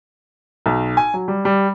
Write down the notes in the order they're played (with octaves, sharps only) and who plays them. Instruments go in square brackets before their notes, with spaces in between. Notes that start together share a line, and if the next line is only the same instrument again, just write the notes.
[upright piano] B1
G#5
F#3
G3
G3